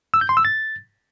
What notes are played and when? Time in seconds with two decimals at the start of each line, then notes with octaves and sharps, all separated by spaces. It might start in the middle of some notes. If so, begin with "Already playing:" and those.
0.14 E6
0.21 G6
0.29 C6
0.37 E6
0.45 A6